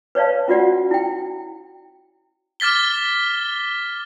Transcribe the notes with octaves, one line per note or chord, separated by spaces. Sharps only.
B4 C#5 D5 F5 A5
C#4 F4 F#4 D5 F#5
E4 G5
D6 F6 A6 B6 G7